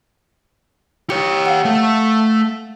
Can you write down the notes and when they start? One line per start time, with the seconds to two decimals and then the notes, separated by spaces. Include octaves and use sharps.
1.10 G4 C#5 C#7
1.46 F5 F#5
1.65 A3 A4